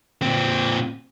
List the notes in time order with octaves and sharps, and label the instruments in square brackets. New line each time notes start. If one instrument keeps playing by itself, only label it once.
[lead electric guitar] A#2 C4